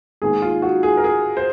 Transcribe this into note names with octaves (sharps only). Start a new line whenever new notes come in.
G#2 D#3 A#3 G#4
F4
F#4
G#4
A#4
G#4
C5